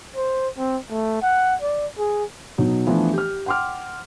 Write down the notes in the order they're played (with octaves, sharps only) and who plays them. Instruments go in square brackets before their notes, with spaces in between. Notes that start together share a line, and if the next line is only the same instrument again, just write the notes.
[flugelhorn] C5
C4
A3
F#5
D5
G#4
[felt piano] B2 F#3 D#4
E3 F3 A3 B3 D4
G4 F6
F#5 G5 C6 D6 F6